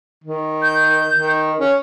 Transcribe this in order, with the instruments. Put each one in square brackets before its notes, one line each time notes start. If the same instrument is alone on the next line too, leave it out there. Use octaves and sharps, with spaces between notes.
[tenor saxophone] D#3
[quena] G6
[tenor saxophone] D#3
C#4